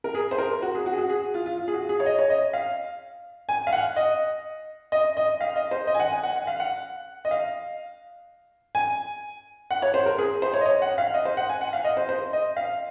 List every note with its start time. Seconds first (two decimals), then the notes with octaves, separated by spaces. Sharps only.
0.04 A#4
0.15 G#4
0.31 C5
0.38 A#4
0.62 F#4
0.75 G#4
0.86 F#4
0.93 G#4
0.98 F#4
1.10 G#4
1.34 F4
1.46 F4
1.58 F4
1.68 G#4
1.74 F#4
1.89 G#4
2.00 C#5
2.06 D#5
2.19 C#5
2.30 D#5
2.53 F5
3.49 G#5
3.67 F5
3.73 F#5
3.96 D#5
4.92 D#5
5.17 D#5
5.41 F5
5.56 D#5
5.71 C5
5.87 D#5
5.95 G#5
6.00 F#5
6.12 G#5
6.23 F#5
6.36 F#5
6.47 F5
6.60 F#5
7.25 D#5
7.31 F5
8.75 G#5
9.71 F#5
9.82 C#5
9.94 C5
10.06 A#4
10.18 G#4
10.42 C5
10.54 C#5
10.61 D#5
10.66 C#5
10.82 F#5
10.98 F5
11.14 D#5
11.25 C5
11.37 F#5
11.50 G#5
11.61 F#5
11.73 F5
11.84 D#5
11.97 C5
12.09 C5
12.33 D#5
12.57 F5